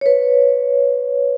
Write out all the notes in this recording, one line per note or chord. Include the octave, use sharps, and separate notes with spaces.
B4 C#5